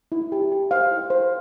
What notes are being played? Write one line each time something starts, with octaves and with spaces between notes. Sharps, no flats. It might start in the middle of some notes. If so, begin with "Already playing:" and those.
E4
G4
G4
C5 F5
E4
C5